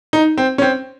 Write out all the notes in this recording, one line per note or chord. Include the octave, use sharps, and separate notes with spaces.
D#4
C4
C#4
C4